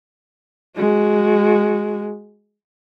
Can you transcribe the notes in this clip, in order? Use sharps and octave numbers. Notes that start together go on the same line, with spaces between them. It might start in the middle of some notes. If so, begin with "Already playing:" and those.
G#3 F#4